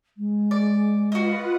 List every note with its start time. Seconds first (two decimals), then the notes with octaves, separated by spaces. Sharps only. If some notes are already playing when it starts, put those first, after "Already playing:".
0.17 G#3
0.51 D5
1.12 F4 F#4 B4 D#5 F#5